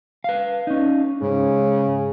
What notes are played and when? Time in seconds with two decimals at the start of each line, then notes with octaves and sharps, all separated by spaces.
0.24 B4 F5
0.67 C#4 D#4
1.22 G#2 C#3